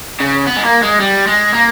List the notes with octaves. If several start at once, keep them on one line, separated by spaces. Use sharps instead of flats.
C#3
B3
G#3
A#3
G#3
G3
G#3
A#3